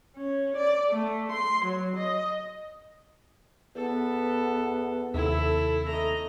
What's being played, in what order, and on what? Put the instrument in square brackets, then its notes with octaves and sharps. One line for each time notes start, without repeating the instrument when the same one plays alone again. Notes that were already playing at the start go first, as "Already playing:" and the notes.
[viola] C#4
D5
A3
C6
F#3
D#5
[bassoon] E2 [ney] B3 [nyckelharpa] A4
[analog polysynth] D#2 C3 [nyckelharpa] E4 [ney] A4
[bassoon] A3 [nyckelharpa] D#5 A#5